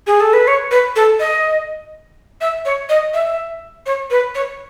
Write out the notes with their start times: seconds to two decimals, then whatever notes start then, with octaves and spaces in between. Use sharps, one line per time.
0.07 G#4
0.20 A4
0.33 B4
0.47 C#5
0.71 B4
0.96 A4
1.20 D#5
2.41 E5
2.65 C#5
2.89 D#5
3.14 E5
3.86 C#5
4.11 B4
4.35 C#5